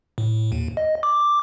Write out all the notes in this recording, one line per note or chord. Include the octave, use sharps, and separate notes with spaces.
A2
D#2
D#5
D6